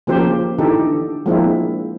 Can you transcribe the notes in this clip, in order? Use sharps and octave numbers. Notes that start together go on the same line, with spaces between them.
C#3 F3 A#3 C4 G4 C5
D3 E3 D#4 G4 A4
F3 G#3 A#3 C4 D4 E4